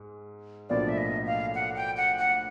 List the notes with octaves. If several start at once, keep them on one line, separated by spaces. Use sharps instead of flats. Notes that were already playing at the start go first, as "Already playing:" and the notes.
Already playing: G#2 G#3
B1 A2 F3 A#3 D4 D5
E5
D#5
F5
F#5
G5
F#5
F#5